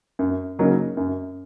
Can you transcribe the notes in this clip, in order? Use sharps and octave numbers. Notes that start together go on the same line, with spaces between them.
F#2
C#3 F#3 A#3 D#4
F#2